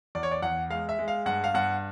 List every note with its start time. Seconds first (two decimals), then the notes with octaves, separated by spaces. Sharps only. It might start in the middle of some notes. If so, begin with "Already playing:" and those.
0.15 E2 D5
0.23 C#5
0.31 D5
0.42 E2 F#5
0.70 G#3 F5
0.89 E5
0.99 G#3
1.08 F5
1.26 G2 F#5
1.44 F5
1.54 G2 F#5